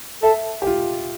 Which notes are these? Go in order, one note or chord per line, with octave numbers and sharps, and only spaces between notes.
A4 E5
G4
F4